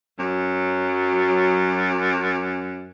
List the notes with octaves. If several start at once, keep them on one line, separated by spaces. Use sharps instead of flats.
F#2 F#3